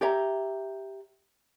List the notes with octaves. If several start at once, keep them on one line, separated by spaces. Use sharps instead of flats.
G4 C#5 E5 A#5